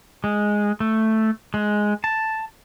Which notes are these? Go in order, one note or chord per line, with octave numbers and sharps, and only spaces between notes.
G#3
A3
G#3
A5